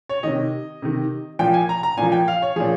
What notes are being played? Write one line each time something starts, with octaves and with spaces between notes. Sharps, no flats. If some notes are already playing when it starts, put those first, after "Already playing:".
C#5
C3 D#3 D#5
C3 D#3
A#2 F3 G5
G#5
A#5
A#5
A#2 F3 G#5
G5
F5
C#5
A#2 F3 G#4